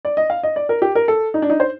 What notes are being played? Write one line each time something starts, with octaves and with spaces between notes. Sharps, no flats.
D5
D#5
F5
D#5
D5
A#4
G4
A#4
A4
D#4
D4
D#4
C5